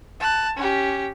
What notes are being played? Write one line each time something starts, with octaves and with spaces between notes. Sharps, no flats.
A5 F#6
C#4 G4